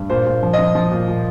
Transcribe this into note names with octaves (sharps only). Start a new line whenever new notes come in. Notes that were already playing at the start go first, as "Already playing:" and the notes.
Already playing: G2
A#2 C5
A#2
F3
D#5
F3
F3
A#2
A#2